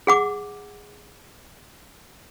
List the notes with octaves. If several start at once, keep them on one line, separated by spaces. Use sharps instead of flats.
G#4 F#5 D6